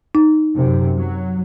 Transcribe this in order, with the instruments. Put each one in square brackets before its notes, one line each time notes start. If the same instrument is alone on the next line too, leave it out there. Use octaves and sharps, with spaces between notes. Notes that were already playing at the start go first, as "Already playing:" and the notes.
[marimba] D#4
[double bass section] F#2 C3
F#3